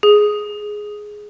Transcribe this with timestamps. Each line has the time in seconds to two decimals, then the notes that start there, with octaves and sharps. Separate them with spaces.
0.03 G#4